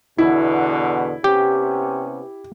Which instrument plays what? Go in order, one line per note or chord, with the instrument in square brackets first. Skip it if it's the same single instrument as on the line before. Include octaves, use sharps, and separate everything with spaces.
[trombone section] E2 B2 D3 [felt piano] E4
[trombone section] C3 B3 C#4 [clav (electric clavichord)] G4